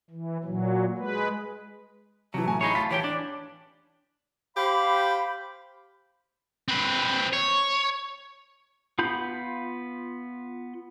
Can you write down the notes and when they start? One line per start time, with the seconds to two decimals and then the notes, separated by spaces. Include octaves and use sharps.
0.10 E3
0.44 A#2 F#3
0.98 G#3 B4
2.34 C3 E3 F#3 A5
2.45 A2 G#5 A#5
2.61 D#4 G#4 C#5 B5
2.75 F4 A5 A6 B6
2.91 E3 G4 C#5 G5
3.04 D4
4.56 G4 C5 F5 B5
6.68 C4 B4
7.33 C#5
8.99 B3 F4 B5 G6